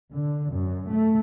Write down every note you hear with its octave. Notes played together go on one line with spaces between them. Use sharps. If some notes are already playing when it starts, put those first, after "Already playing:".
D3
F#2
A3